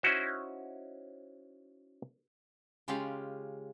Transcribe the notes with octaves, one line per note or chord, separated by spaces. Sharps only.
C#4 D#4 E4 F#4 C5
C#3 G#3 C#4 F4 G4 F5